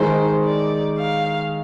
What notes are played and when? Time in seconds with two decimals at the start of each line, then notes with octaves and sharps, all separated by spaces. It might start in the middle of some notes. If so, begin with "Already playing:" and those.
Already playing: D#3 G#3 D#4 C5
0.44 D5
0.99 F5